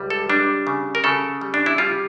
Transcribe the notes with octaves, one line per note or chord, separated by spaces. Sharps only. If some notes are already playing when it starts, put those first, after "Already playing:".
Already playing: C#2 G3
A4
G3 D4
C#3
A#4
C#3 A4
G3
D4
E4
G3 F4